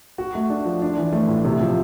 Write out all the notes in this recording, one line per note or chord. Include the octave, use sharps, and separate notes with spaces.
F#4
A3
D4
F3
D4
E3
A3
A2
C3
F3